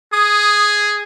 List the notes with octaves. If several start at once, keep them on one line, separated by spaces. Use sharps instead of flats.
G#4 D#6